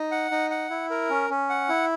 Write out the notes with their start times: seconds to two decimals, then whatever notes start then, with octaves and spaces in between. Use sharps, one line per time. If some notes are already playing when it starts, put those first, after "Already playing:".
Already playing: D#4
0.12 F#5
0.31 D#4
0.50 F#5
0.70 E4
0.90 A#4
1.10 C#4
1.30 C#4
1.50 F#5
1.69 E4